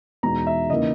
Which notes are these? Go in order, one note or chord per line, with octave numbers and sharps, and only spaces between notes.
E2 B2 G#3 D#4 A#5
E5
C#3 E3 A#3 D#4 D#5